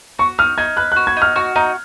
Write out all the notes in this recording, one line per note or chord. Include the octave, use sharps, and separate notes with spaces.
F#4 C#6
D#4 F6
D#4 G#6
B4 F#6
F#6
F#4
G#6
D#4
F6
F#4 C#6
D#4 A#5